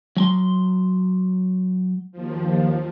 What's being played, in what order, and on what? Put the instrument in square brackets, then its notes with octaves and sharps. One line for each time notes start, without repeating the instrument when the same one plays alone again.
[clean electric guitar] F#3 G#5 C6
[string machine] D#2 F3